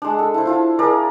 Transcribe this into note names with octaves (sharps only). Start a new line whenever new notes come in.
G#3 D4
A4
E4 C5
E4 F4 A5
G#4 A#4 D5